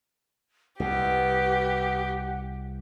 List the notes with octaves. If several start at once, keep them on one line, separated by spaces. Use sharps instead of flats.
C2 B2 G4 F#5